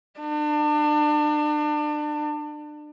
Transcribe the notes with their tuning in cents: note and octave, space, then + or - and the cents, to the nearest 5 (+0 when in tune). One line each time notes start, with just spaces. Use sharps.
D4 +30